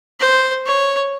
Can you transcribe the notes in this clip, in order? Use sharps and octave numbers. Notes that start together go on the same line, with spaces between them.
C5
C#5